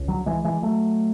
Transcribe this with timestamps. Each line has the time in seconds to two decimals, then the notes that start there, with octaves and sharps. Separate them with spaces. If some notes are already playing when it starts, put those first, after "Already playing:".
Already playing: C#2
0.08 D3 F#3
0.26 E3 G#3
0.44 E3 G#3
0.62 F#3 A3